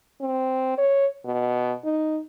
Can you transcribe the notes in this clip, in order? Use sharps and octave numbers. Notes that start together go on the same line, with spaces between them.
C4
C#5
B2
D#4